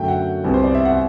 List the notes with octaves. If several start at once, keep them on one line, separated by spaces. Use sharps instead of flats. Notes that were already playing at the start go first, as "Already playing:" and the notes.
Already playing: F#2 D3 F#3 A3 G5
F#5
C2 C3 G3 B3
C5
D5
E5
F#5